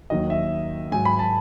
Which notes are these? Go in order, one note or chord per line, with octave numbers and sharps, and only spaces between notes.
D#2 D#3 F#3 D#5
E5
G#2 F#3 G#5
B5
A5